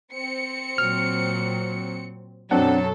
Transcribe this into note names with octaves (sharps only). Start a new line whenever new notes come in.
C4 C#7
A#2 F#3 F6
F#2 B2 F#3 C4 D4 A4 F#5